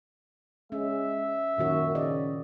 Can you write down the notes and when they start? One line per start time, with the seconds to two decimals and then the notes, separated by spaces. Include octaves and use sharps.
0.72 G#3 C#4 E5
1.58 F#2 A#2 D#3 F#4
1.95 C#3 D5 D#5